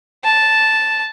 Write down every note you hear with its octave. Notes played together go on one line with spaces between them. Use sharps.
A5